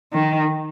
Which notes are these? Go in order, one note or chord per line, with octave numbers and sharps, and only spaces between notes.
D#3